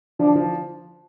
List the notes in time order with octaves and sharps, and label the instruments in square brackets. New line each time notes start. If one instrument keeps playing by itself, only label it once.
[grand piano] F3 [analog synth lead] D4
[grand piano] F3